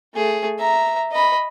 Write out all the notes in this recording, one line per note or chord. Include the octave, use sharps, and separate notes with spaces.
A3 G#4
E5 A#5
D#5 B5